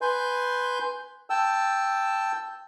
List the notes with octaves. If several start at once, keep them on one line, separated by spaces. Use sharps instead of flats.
B4 G#5 C6 G6
G5 A5 E6